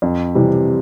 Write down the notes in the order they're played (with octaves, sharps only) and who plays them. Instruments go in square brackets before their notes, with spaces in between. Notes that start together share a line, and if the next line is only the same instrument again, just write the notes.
[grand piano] F2
C3 E3 G3